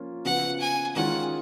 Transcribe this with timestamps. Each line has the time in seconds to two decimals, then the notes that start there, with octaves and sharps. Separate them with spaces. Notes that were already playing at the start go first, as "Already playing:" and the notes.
Already playing: F3 A#3 C#4 F4
0.25 C#3 F3 B3 F#5
0.60 G#5
0.96 D#3 G#3 C#4 F4 G#4 F#5